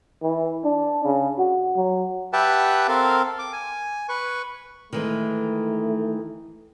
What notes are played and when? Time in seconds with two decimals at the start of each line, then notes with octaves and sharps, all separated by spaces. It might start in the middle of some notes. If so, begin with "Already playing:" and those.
0.22 E3
0.64 D4
1.05 C#3
1.39 F#4
1.77 F#3
2.33 G4 B4 E5 F#5 G5 A5
2.88 C4 A4 A#4 F5
3.39 D6
3.53 G#5
4.09 B4 C#6
4.93 D#3 E3 G#3 A3